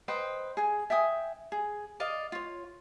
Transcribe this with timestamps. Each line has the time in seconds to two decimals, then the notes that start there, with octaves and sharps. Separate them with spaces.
0.08 B4 C5 D#5 G5
0.57 G#4 G#5
0.90 E5 G5 G#5 D#6
1.52 G#4
2.00 D5 D#5 F5
2.32 F4 C#5